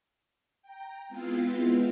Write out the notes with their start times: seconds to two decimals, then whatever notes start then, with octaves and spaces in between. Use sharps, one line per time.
0.62 G5 A#5
1.08 G#3 B3 C4 E4 F4 F5